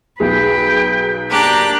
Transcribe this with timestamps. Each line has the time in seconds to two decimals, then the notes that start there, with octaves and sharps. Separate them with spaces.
0.20 B1 G#4 B4 G5
1.30 A#3 D4 G4 A#5 F#6